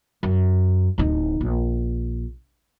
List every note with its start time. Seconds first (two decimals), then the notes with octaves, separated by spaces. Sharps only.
0.23 F#2
0.98 D1 D#4
1.41 A#1